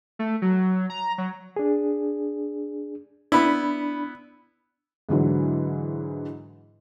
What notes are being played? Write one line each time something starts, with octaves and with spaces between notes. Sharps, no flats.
A3
F#3
A#5
F#3
D4 G#4
B3 D4 E4 B5
G#2 D3 E3 F#3